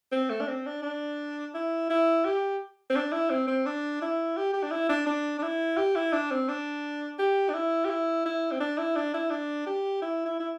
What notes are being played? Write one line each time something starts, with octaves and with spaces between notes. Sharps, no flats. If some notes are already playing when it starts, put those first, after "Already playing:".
C4
A3
D4
C4
D4
D4
E4
E4
G4
C4
D4
E4
C4
C4
D4
E4
G4
G4
D4
E4
D4
D4
D4
E4
G4
E4
D4
C4
D4
G4
D4
E4
G4
E4
E4
C4
D4
E4
D4
E4
D4
G4
E4
E4
E4